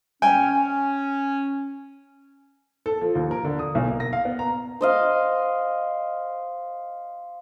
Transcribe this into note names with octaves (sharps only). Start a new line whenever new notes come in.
C#4 G5 G#5
A4
F3
D#2
A#4
D3
D#6
B1
A#3
A#6
F5
B3
A#5
C5 D#5 F5